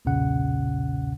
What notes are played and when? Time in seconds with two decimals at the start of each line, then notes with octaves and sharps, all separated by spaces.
0.05 B1 E2 A#2 C#3 C#4 F#5